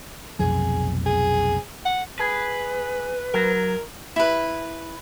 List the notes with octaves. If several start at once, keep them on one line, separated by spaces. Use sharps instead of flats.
F1 B1 F2 G#4
G#4
F#5
G#4 B4
F#3 A#4
E4 B4